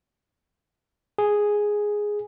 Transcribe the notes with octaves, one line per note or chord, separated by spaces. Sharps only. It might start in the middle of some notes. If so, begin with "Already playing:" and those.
G#4